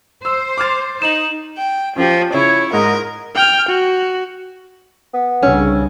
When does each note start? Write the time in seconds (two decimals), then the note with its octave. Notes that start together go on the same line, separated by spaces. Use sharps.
0.25 C5 E6
0.58 D6 F6 A6
1.02 D#4 E7 F#7
1.58 G5
1.96 F3 C#4 G4
2.33 C#3 E4 C#5
2.73 G#2 A#4 D#5
3.35 G5 F6
3.68 F#4
5.14 B3
5.43 C2 C#3 G3 C#4 D4 E6